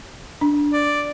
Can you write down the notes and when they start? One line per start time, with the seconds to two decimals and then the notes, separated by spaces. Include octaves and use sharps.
0.41 D4
0.73 D5